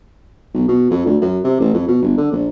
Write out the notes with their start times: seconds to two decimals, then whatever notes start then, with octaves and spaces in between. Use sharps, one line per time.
0.54 B1
0.68 B2
0.91 F2
1.06 D2
1.22 F#2
1.44 C3
1.60 A1
1.73 F2
1.88 B2
2.02 G1
2.17 D3
2.32 A#1